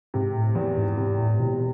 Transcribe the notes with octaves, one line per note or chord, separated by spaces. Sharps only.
G#2 C3
A2
E2
G#2
G#2 C3
A2
E1 B2